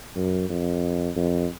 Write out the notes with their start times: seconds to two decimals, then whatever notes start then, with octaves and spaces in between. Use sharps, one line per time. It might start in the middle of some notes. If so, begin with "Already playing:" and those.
0.15 F#2
0.49 F2
1.16 F2